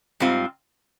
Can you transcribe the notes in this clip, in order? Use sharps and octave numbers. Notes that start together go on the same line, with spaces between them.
G#2 G3 C4 F4